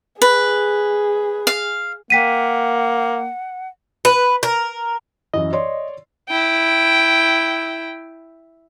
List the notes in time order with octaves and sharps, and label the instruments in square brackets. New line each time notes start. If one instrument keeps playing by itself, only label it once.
[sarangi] G#4 [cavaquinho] B4
[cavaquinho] F5
[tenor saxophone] A#3 [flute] F#5 [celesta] G5 B6 D#7
[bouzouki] B4
A#4
[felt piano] F#2 E3 [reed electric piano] D#5
[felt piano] C#5 D5 C6
[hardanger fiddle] E4 G5